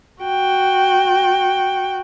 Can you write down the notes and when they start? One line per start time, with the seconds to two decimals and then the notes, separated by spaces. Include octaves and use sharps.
0.23 F#4 G5